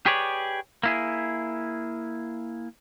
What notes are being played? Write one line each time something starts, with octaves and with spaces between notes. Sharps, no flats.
G4 G#4 B4 C#5 D5
A#3 E4 G#4